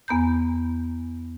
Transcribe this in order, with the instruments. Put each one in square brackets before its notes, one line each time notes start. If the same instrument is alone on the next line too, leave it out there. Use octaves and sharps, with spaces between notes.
[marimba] E2 B3 A#5 G6